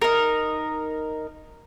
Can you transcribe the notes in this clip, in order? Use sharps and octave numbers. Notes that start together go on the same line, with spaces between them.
D#4 A#4